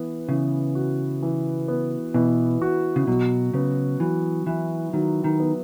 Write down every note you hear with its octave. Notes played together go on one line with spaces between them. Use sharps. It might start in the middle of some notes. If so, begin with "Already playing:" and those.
Already playing: E3 B3
C#3 E3
F#4
E3
B3
B2 E3
F#4
C#3
B2 F#3
C#3 B3
E3 F#3
E3 E4
D#3 F#3
D#3
B3